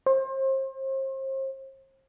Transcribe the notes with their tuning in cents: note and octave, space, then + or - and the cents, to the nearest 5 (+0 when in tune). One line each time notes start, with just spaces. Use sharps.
C5 +35